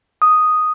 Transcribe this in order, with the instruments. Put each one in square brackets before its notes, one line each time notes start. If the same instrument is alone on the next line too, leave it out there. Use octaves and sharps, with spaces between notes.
[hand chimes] D#6